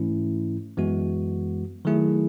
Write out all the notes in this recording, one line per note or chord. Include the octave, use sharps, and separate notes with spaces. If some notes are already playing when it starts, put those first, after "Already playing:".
Already playing: G#2 E3 A3 C#4 E4
F#2 E3 G#3 B3 F#4
D#3 F#3 A3 E4 G#4